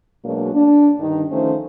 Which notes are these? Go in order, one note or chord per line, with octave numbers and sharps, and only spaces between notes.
B2 F#3 G#3 A#3 D4
D4
G2 D3 D#3 D#4
D#3 F3 A3 C#4 D#4 C5